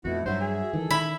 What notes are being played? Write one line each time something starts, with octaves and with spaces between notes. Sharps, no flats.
F2 B2 A3 B3 E4 F#4
G2 F#3 F#4 C5 E5
G#4
D#3 E3 G#3 A4
D#3 E4 B5